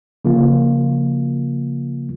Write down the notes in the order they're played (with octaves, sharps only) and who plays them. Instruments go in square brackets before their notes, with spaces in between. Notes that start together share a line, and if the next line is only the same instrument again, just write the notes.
[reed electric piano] C#3 F3 A#3 F4